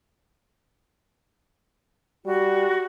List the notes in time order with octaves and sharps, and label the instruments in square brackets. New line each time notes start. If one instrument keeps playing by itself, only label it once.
[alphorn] G3 [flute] F#4